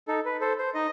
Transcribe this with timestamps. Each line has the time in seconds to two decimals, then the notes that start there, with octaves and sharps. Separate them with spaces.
0.08 D#4 A4
0.25 B4
0.41 A4 C5
0.58 C5
0.74 D#4 D#5